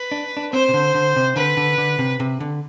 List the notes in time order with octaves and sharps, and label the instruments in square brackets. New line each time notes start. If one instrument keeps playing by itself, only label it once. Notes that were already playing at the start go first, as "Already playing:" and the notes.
Already playing: [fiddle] B4
[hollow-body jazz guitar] D4
D4
[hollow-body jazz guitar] C4 [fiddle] C5
[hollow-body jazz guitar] C3
D3
D3
C3
[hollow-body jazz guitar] D3 [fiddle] B4
[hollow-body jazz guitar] D3
D3
C3
C3
D3